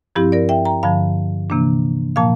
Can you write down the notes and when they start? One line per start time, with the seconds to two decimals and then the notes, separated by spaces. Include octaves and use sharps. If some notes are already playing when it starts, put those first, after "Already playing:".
0.16 G2 F3 C4 E4 G4
0.32 A#4 D5
0.49 E5 G5
0.65 G5 A#5
0.83 G2 D3 F3 F5 A5
1.50 C3 E3 A#3 D4
2.16 A#2 F3 A#3 F5 A5